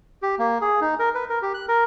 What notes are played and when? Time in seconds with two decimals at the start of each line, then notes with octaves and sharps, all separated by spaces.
0.22 G4
0.39 A#3
0.61 G#4
0.81 D#4
0.99 A#4
1.15 B4
1.29 A#4
1.42 G4
1.54 F#6
1.68 A#4